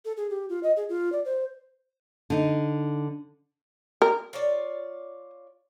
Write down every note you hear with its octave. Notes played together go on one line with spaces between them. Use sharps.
A4
G#4
G4
F4
D#5
G#4
F4
D5
C5
D3 D#4
A#4
F4 C#5 D5